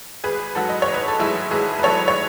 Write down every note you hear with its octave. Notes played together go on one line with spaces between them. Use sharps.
G#1 G#4 B4
G#2 F#3 F#4 A4
D#5
C#5
G#1
B4
A4
G#2 F#3 E4 G#4
G#1 G#4 B4
B4
G#2 F#3 A4 C#5
C#5